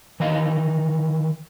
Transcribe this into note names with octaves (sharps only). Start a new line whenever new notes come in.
D#3 E3 D#5 F5